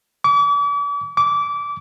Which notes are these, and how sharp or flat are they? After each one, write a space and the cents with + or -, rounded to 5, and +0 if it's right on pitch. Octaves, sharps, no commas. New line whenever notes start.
D6 -40
D6 -20